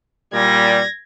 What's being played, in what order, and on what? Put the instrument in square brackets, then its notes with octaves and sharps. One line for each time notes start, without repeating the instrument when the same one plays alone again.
[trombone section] A#2 G3 [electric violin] G#6 A#6